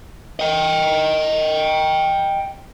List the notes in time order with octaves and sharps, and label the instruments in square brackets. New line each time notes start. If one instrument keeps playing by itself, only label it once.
[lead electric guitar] D#5 G5